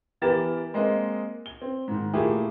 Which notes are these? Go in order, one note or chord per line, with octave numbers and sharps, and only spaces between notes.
E3 B3 G4 A#4 A6 E7
G#3 A#3 C4 D#5
G7
C4
G#2 D#3
A#2 A3 A#3 E4 G4 G#4